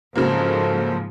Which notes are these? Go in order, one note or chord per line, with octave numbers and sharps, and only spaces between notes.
G#2 C#3 F3 F#3 A#3 A4 C5